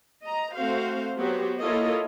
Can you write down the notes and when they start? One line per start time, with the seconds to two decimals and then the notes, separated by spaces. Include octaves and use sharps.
0.24 D#5 A#5
0.54 A3 C4 F#4 C5 F5
1.18 F#3 B3 F#4 G4 C5
1.61 A#3 E4 F4 A4 C#5 D#5